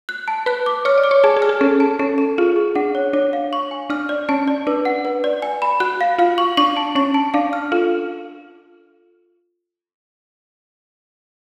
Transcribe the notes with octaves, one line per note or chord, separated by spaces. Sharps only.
F#6
A5
B4 F#6
D6
C#5 F6
D5
D6
C#5
G#4 A5
G#4
F6
G#4
C#4 A4
A5
C#4 A4
A4
F4 G#4
G#4
D4 F#5
C#5
D4 C#5
F5
C#6
G#5
D4 F6
D5
C#4 A5
D5
D4 B4
F#5
B4
D5
G#5
B5
F#4 F#6
F5
F4 F5
C#6
D4 C#6
A5
C#4 C#6
A5
D4 F5
F6
F4 A4